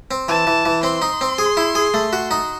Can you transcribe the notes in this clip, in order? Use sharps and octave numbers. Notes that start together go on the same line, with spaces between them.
C4
E3 A5
E3
E3
C4 C6
D#4
C4
G#4
E4
G#4
A3
F#4
D#4